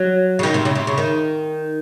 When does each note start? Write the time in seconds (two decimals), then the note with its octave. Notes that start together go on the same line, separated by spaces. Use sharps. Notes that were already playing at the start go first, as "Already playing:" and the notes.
Already playing: F#3
0.39 C#3
0.43 D#3
0.54 C3
0.65 C#3
0.75 C3
0.87 C#3
0.98 D#3